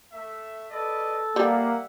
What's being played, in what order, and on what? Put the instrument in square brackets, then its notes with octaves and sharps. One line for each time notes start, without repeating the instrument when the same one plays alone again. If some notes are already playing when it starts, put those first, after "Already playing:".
[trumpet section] A3 E5
[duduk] A4 [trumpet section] B4 D5 D#5
[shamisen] G3 [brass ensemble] A#3 [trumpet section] E5 F#5